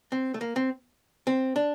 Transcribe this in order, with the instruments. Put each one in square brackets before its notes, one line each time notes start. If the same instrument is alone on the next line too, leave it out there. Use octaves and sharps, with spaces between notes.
[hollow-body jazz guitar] C4
A3
A#3
C4
C4
D4